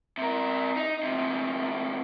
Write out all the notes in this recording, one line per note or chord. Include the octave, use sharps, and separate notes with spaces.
C3 A#4
D#4
E2 C3